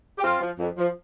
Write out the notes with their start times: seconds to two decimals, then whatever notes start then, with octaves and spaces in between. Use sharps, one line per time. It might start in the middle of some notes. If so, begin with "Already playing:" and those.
0.19 G4
0.24 F2 C4 F4
0.41 F3
0.59 F2
0.78 F3